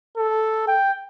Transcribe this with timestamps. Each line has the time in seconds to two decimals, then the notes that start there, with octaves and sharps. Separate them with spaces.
0.17 A4
0.68 G5